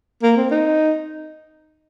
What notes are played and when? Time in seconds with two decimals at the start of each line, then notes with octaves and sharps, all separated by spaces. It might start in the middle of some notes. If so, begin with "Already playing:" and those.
0.23 A#3
0.37 C4
0.51 D#4